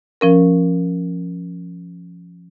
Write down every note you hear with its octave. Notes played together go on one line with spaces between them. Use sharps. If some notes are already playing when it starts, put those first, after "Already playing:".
F3 C#4 A#4